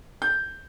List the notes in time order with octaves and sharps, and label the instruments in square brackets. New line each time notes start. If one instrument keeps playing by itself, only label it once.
[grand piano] G6